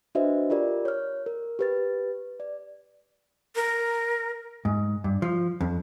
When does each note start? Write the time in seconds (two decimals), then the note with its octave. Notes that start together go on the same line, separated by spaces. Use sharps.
0.15 D4 F#4 B4 C5 D#5 E5
0.50 F4 G4 A#4 D5
0.85 C#5 F6
1.26 A#4
1.59 G4 B4 A6
2.40 D5
3.56 A#4
4.65 G#2
5.04 G2
5.22 F3
5.61 F2